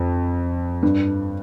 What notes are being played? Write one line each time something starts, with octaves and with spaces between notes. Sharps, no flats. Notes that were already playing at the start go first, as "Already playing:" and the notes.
Already playing: F2
G2